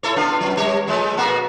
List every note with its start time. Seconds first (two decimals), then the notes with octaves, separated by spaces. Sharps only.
0.03 E4 A4 C#5
0.16 B3 D4 F4
0.40 F#2 F#3
0.57 G3 C#5
0.87 F3 G#3 A3
1.17 B2 A#3 F#4